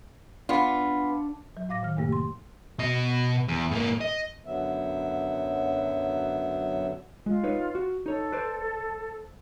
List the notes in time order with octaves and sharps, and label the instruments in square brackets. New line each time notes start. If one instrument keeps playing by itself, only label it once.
[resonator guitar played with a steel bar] B3 F4 [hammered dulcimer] D4
[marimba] F#3
A2 F5 D6 A#6
D#3 F6
F#2 A2 C3 A3 A#3 G4
C6
[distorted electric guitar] B2 D#5
E2
G#2 A#3
D#5
[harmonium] F#2 D3 F#3 B3 E5
[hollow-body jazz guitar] G#3 [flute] F4
[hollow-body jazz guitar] D#4 B4 C#5
F#4
[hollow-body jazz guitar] D#4 C#5 [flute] A4
[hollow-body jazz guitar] B4 C5 D5